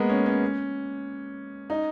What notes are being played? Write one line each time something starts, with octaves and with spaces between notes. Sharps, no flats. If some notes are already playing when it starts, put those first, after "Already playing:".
Already playing: G#3 A#3 B3
C#4
C#4
D#4